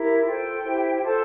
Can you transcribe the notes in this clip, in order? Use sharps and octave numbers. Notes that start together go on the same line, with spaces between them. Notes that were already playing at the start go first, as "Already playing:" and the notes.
Already playing: E4 G4 A#4
F4 A4 C5 G5
E4 G4 C5
F4 A4 C5 A5